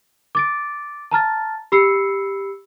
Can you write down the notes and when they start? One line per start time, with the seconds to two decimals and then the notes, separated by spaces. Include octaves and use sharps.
0.35 D6 A6 D7
1.11 A5 A#5 F6 A6
1.72 G4 B5 E6 C7 C#7